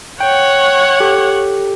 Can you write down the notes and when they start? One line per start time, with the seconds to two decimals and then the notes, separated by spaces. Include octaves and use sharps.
0.20 C#5 F#5 G5
1.00 G4 A4